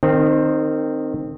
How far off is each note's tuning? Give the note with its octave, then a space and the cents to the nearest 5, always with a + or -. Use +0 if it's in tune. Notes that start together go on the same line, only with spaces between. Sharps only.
D#3 -20 C4 +0